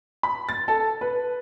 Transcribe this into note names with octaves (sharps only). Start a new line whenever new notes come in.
B5
A6
A4
B4